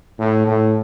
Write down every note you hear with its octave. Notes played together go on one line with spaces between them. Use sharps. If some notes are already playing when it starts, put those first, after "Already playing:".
A2
A2